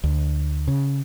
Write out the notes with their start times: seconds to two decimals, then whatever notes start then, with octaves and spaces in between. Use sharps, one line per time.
0.04 D2
0.68 C#3